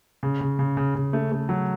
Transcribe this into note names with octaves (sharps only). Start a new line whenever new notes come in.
C#3
C#3
C#3
C#3
C#3
A3
A3
F#3